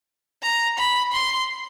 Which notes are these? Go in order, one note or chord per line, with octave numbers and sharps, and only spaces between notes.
A#5
B5
C6